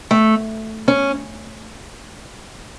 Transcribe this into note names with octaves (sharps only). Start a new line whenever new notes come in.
A3
C#4